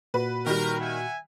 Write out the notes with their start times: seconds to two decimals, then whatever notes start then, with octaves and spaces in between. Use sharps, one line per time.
0.14 A#2 F#4 B4
0.46 D#3 G3 A#4 B4
0.81 E5 F#5 G#5